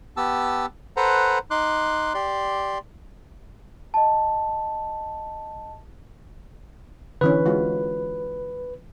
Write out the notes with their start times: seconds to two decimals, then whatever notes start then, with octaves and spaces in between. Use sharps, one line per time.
0.17 B3 G4 A5 E6
0.97 A4 B4 C5 F#5 A#5
1.51 D#4 C6 D6 F#6
2.14 G4 D5 C6
3.94 D#5 A5
7.21 D3 E3 C#4 B4
7.46 G#3 F4 F#4